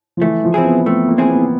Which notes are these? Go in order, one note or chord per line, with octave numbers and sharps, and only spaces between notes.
F3
E3 A3
F3
C4 E4 G#4
B3
A3 C4
A#3
C4 E4 G#4
B3